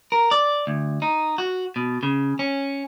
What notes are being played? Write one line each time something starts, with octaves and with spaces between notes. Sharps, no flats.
A#4
D5
D2
D#4
F#4
B2
C#3
C#4